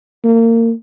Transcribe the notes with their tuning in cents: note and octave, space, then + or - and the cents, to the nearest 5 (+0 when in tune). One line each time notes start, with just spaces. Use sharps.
A#3 -30